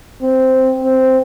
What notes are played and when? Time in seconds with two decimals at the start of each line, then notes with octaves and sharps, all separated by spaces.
0.22 C4
0.84 C4